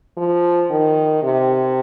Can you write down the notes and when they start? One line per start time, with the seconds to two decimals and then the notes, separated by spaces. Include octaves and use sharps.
0.17 F3
0.70 D#3
1.23 C3